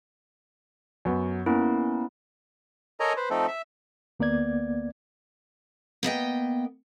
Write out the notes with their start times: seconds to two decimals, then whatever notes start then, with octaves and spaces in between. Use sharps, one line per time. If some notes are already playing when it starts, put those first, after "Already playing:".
1.05 F#2 B3
1.46 A#3 B3 C#4 E4
3.00 A4 A#4 C#5 D#5 G#5 A#5
3.17 B4 C5
3.30 F3 A3 C4 D#4 A4
3.48 E5
4.20 D2 A#3 B3 D5 G#6
6.03 A#3 B3 D#5 G5